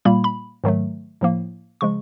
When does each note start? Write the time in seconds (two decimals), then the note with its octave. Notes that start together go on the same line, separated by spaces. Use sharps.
0.05 A#2 G3 A#3 B5
0.24 B5
0.64 G#2 D#3 F#3 A3
1.21 A2 F3 A#3
1.81 C#3 F3 G#3 C#6